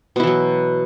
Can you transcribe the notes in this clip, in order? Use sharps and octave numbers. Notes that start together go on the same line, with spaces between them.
B2 E3 F#3 E4